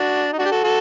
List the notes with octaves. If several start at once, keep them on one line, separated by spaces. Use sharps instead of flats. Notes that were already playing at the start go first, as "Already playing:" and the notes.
Already playing: D4 F#4
D#4
D4 F#4
G4
F#4 A4
F#4 A4